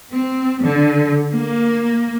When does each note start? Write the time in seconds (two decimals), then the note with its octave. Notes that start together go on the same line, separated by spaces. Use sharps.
0.11 C4
0.62 D3
1.34 A#3